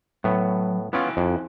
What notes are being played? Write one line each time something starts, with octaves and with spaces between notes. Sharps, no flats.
A2 F#3 B3
B3 C#4 E4 F4 G5 G#5
F2